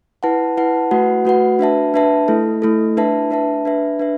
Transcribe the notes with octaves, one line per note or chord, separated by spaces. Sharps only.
E4 B4 F#5 A5
E4 B4 F#5 A5
A3 F#4 B4 F#5
A3 F#4 B4 F#5
D4 B4 E5 A5
D4 B4 E5 A5
A3 E4 A4
A3 E4 A4
D4 B4 E5 A5
D4 B4 E5 A5
D4 B4 E5
D4 B4 E5